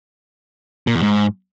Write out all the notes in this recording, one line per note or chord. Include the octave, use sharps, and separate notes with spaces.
A#2
E2
G#2